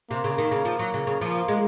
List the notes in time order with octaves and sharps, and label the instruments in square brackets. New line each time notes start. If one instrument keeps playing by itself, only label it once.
[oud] C3 [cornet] A#3
[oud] C#3
D#3
C#3
F3
F#3
C#3
C#3
[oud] F3 [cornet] A#3
[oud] G#3